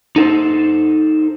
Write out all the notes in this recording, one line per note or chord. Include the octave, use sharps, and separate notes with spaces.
D#4 A4 C5